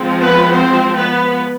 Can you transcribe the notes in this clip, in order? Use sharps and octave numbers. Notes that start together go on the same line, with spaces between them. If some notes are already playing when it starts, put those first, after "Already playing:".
Already playing: F3 G#3 C4
B3 B4
C4 C5
B3 B4